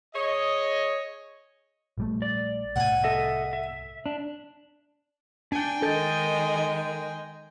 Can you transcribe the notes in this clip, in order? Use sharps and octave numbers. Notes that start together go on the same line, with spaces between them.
G#4 C#5 D#5
A#1 G3 A3
D5
C2 A2 F#5 G#5
A4 D#5 E5
E5
D4
D4 G5 G#5
D#3 G#3 A4 A#4 D#5 G6